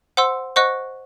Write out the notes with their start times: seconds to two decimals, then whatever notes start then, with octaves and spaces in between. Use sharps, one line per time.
0.17 C5 F#5 C6 E6
0.56 C5 D#5 F#5 C#6 F#6